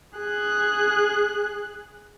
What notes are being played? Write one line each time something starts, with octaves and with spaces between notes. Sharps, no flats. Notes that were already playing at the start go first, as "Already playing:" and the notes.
G#4 F#6